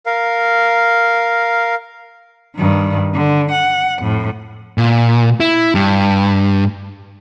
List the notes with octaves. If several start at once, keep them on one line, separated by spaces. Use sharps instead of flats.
A#4 F5
G2 D#3
D3
F#5
F2 A2
A#2
E4
G2